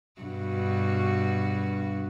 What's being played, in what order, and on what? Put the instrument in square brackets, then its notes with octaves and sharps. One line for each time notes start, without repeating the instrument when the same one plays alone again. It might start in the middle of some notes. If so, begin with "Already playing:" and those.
[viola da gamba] G2 B2 F#4